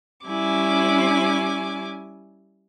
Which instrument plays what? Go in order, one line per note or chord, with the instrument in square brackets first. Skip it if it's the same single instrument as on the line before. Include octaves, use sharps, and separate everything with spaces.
[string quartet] G3 C#4 E4 G#5 D6